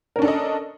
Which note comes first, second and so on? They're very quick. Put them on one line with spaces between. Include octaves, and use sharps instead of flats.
A#4 C#4 D4 A4 D#5